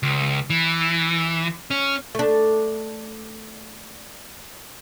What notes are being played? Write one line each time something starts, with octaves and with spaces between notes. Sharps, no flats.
C#2
E3
C#4
A3 D4